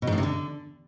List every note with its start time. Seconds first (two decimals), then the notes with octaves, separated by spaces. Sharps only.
0.02 B2
0.07 G#2
0.13 A2
0.18 C3
0.23 D3